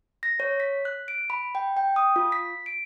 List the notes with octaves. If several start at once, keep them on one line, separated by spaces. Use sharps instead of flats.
A#6
C#5
B6
F#6
D7
B5
G5
G5
D#6
F4
B6
D7